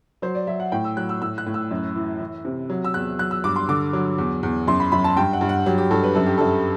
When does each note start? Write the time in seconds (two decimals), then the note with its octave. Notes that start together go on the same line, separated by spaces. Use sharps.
0.22 F#3 C5
0.35 D5
0.47 F#3 E5
0.60 F#5
0.72 A2 G5
0.84 E6
0.97 F#3 F#6
1.09 E6
1.21 A2 E6
1.38 F#6
1.46 A2
1.54 E6
1.71 F#2
1.95 E3
2.20 E3
2.45 C3
2.70 F#3
2.84 E6
2.94 E2 F#6
3.19 F#3 F#6
3.31 E6
3.44 G2 D6
3.56 C6
3.69 D3 D6
3.93 F#3
4.18 E2
4.43 E2
4.67 F#2 C6
4.80 B5
4.92 F#2 B5
5.04 A5
5.17 G2 G5
5.33 F#5
5.41 G2
5.49 F#5
5.66 F#3 G4
5.78 G4
5.91 G2 A4
6.03 B4
6.15 F#2 A4
6.26 G4
6.38 F#2 A4